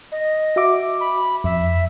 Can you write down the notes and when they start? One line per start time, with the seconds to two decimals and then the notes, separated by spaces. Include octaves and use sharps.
0.12 D#5
0.56 F#4 E5 D6
1.01 B5
1.44 F2 E5